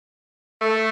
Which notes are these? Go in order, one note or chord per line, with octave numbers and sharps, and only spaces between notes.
A3